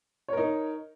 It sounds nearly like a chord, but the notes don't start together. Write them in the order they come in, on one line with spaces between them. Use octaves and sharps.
C#5 A#4 D#4